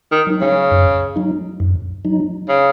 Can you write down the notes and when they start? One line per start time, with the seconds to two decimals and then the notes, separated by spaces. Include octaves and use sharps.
0.12 D#3
0.27 F#3 D#4
0.41 C#3
0.71 F#2
1.16 F#3 D#4
1.60 F#2
2.05 F#3 D#4
2.49 C#3